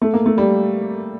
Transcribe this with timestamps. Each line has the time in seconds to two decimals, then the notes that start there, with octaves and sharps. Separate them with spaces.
0.02 A3
0.14 A#3
0.26 A3
0.38 G3